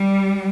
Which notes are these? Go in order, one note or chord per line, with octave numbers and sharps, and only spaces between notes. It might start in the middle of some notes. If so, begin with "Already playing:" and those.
Already playing: G3